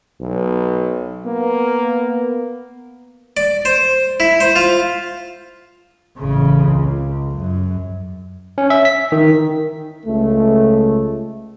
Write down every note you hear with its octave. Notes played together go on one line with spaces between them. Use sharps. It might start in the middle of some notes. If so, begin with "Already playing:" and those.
B1
A#3 B3
D5
C5
E4
C5
F4
A1 C#3
C#2
F#2
C#4
E5
B6
D#3
C#2 A3